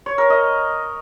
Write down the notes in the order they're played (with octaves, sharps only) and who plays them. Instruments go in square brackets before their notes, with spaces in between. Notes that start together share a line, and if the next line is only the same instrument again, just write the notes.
[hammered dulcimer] C#5
A#4
D#5